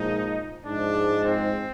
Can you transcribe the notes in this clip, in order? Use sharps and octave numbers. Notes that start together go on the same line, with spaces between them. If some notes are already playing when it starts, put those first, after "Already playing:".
Already playing: A#2 F3 G#3 D#4
G#2 F3 G#3 D4
C4